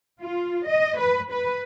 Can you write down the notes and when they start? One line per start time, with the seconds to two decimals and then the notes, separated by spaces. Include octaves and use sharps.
0.20 F4
0.68 D#5
0.99 B4
1.32 B4